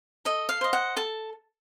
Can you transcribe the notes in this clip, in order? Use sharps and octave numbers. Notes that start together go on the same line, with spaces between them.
A4 D#5
F5
C5 D#5
F#5
A4 A5